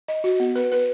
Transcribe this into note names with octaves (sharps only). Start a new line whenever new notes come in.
D#5
F#4
B3
B4
B4